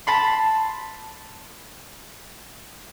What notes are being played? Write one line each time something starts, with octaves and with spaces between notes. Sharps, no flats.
A5 B5 C6